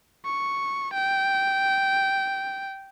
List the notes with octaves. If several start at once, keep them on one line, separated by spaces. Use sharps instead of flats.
C#6
G5